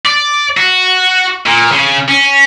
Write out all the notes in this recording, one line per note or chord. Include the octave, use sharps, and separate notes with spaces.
D5
F#4
A#2
C#3
C#4